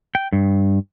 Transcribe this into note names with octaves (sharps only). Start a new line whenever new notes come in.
G5
G2